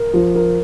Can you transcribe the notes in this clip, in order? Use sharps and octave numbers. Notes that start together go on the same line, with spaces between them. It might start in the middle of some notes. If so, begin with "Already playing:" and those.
Already playing: A#4
F3
A#4